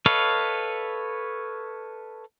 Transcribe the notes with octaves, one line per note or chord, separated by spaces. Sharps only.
A4 B4 C#5 D#5 F5